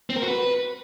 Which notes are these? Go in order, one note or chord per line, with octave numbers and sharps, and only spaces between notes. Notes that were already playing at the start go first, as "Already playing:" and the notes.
C4
A#4
F#4
B4